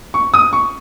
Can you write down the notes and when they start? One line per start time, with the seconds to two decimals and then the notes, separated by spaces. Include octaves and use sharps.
0.14 C#6
0.34 D#6
0.53 C#6